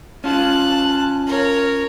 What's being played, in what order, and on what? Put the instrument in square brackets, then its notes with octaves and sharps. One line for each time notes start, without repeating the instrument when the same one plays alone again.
[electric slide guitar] C#4 F4 [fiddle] A5 F#6
[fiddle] A#4 C#5